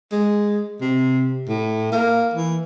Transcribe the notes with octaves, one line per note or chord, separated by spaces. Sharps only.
G#3
C3
A2
A#3
E3